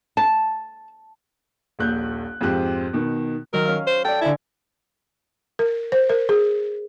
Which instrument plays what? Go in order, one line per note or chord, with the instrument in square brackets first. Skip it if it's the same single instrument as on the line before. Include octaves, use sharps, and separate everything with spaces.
[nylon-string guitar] A5
[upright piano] D#1 A#1 F#6 G6
F2 G#2 C4 G4 F#6
B2 D#3
[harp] D#3 F#3 [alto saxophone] A#4
[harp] C#4 F5
[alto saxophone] C5
[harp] A4 D5 [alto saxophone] G5
[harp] D3 G#5 [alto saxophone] E4
[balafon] A#4
C5
A#4
G#4